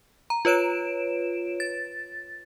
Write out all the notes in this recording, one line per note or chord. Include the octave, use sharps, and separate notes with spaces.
A#5
F4 B4 C#5 D7 E7
A6